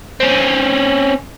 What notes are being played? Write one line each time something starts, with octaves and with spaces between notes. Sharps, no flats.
C4 C#4